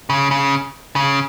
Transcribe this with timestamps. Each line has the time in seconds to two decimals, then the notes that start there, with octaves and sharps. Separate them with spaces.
0.10 C#3
0.31 C#3
0.96 C#3